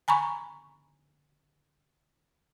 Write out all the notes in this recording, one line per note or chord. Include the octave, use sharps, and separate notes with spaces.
G#5 A#5 B5 C#6